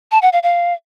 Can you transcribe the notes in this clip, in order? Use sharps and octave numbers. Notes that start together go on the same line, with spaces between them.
A5
F#5
F5
F5